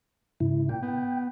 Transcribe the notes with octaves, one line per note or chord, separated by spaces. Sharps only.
G#2 C#3 E4
A#2 G5
B3